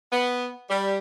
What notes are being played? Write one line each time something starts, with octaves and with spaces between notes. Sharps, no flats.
B3
G3